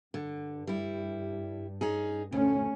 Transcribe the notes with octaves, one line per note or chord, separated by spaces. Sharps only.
G2 D3
G3 E4
C#4 D#4 G#4
D2 A3 C#4